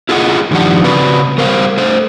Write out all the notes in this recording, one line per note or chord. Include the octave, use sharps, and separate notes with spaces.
E4 F4 G#4 D#5 F#5
G2 D#3 F3 G3 D4 F#5
C#3 C4 F#4 B4 D5
G3 A#4 C5 F5
A3 C5